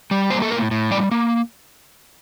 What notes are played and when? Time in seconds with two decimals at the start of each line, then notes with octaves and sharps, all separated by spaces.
0.11 G3
0.30 A#3 C5
0.42 A4
0.50 A2 A#4
0.71 A2
0.91 G3 D5
1.11 A#3